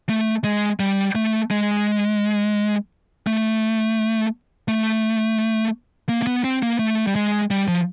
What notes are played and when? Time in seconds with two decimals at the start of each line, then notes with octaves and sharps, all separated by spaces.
0.09 A3
0.44 G#3
0.80 G3
1.15 A3
1.51 G#3
3.27 A3
4.68 A3
6.09 A#3
6.22 A#3
6.27 B3
6.44 C4
6.62 A#3
6.79 A3
7.07 G3
7.16 G#3
7.51 G3
7.68 F3